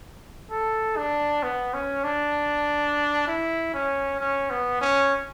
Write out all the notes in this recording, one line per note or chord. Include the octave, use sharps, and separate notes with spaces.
A4
D4
B3
C#4
D4
E4
C#4
C#4
B3
C#4